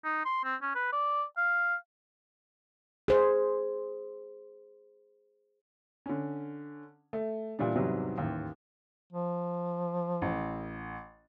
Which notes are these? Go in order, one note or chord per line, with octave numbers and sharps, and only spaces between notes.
D#4
C6
C4
C#4
B4
D5
F5
G#4 C5
D3 C#4
A3
A#2 E3 G3 D4
E2 G#2 C3 E3 F#3 G3
A1 D#2
F3
A1